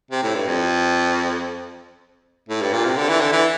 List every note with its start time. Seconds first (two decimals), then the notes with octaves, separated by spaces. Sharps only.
0.11 C3
0.23 A2
0.35 G2
0.47 F2
2.49 A2
2.61 G2
2.73 A#2
2.85 C3
2.97 D3
3.09 E3
3.21 D3
3.33 E3